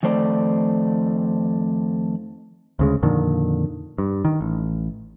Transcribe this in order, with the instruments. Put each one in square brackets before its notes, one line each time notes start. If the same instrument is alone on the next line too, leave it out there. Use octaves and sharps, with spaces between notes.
[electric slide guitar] F2 D#3 A3 C5 D5
[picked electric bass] D2 C#3 G#3
F2 A#2 D3 D#3
G2
D#3
A1